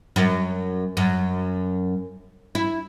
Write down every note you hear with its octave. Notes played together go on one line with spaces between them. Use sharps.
F#2
F#2
E4